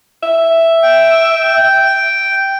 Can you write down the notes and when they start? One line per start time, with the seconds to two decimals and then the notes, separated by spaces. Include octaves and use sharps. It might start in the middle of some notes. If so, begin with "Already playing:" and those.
0.23 E5
0.83 G5